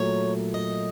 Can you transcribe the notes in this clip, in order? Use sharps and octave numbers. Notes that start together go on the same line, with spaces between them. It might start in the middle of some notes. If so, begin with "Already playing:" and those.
Already playing: A#2 F#3 A3 C#5
D#5